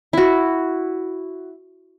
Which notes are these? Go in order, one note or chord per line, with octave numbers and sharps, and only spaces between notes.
E4 F#4